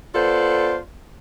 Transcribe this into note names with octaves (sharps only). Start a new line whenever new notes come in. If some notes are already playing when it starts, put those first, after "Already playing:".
B3 F4 A4 C5 D5